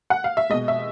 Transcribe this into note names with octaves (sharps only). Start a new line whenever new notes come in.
F#5
F5
E5
B2 G#3 D#5
E5